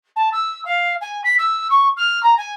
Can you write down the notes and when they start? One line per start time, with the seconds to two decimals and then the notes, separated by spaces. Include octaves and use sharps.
0.16 A5
0.32 E6
0.65 F5
1.01 G#5
1.24 B6
1.38 E6
1.70 C#6
1.96 F6
2.23 A#5
2.37 G#5